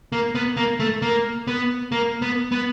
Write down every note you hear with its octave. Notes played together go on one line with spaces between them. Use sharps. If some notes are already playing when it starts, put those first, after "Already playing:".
A#3
B3
A#3
A3
A#3
B3
A#3
B3
B3